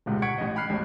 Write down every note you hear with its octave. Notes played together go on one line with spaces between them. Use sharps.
G1 C#2 G#2 C3
F#5 C#6 G#6 B6 C#7 D7
A1 D#5
G5 B5 F6 F#6 C7
E1 A1